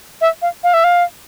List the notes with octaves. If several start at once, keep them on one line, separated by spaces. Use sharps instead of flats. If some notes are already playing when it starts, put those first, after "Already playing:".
E5
F5
F5
E5
F5